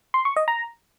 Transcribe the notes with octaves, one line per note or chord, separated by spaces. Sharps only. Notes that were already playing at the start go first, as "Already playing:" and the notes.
C6
C#6
D#5
A#5